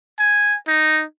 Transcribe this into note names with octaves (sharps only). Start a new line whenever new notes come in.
G#5
D#4